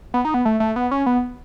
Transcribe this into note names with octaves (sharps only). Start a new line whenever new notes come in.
B3
D#4
B3
A3
A3
B3
C#4
B3